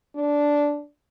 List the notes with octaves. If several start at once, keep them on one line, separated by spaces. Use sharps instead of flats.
D4